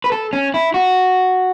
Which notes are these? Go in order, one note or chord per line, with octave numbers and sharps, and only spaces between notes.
B4
A4
C#4
E4
F#4